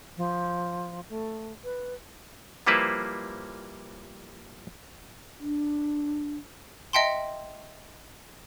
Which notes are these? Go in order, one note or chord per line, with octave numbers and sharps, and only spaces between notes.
F3
A3
B4
F3 G3 A#3 E4 B4 C5
D4
D#5 E5 F#5 G5 A5 C6